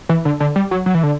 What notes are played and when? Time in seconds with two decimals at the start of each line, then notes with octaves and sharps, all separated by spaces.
0.09 E3
0.25 D3
0.40 D3
0.56 G3
0.71 F#3
0.86 F#3
0.94 E3
1.03 D3